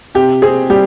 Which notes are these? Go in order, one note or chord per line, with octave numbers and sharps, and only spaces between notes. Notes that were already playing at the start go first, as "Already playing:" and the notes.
C3 G4
C4 G#4
G3 G4